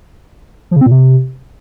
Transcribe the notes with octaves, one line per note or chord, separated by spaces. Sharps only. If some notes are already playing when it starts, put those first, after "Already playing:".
F3
C#3
C4
A#2
C3